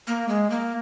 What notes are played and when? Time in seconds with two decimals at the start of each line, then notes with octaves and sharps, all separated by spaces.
0.07 A#3
0.28 G#3
0.50 A#3